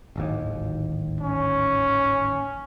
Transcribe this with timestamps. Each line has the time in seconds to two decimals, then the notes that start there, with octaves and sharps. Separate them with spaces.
0.16 D1 G#1 D#2
1.21 C#4